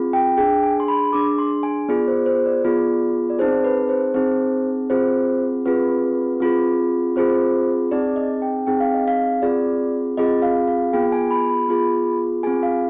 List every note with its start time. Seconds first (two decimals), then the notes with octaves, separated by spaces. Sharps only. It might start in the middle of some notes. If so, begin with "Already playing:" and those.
Already playing: C4 F4 G#4
0.13 G5
0.37 D4 G#4 G5
0.63 G#5
0.80 C6
0.88 B5
1.13 D4 G#4 D6
1.38 C6
1.63 G#5
1.89 B3 F4 G#4 D5
2.08 C5
2.26 C5
2.46 D5
2.65 B3 F4 G#4
3.30 D5
3.39 C4 D#4 G#4 C5
3.64 B4
3.89 C5
4.14 C4 D#4 G#4 C5
4.90 C4 F4 G#4 C5
5.66 C4 F4 G#4 B4
6.40 C4 F4 G#4
7.16 C4 F4 G#4 C5
7.91 C4 D#4 G#4 D5
8.16 D#5
8.42 G5
8.67 C4 D#4 G#4 G5
8.80 F5
8.94 D#5
9.08 F5
9.42 C4 F4 G#4 D5
10.17 C4 F4 G#4 D#5
10.42 F5
10.68 F5
10.93 B3 F4 G#4 G5
11.12 G#5
11.31 B5
11.50 B5
11.68 B3 F4 G#4
12.43 C4 F4 G#4 G#5
12.63 F5